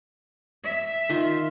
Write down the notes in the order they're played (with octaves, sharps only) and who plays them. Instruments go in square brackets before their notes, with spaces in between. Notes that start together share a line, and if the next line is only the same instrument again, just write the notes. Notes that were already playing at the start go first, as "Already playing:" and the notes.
[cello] E5
[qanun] D#3 F4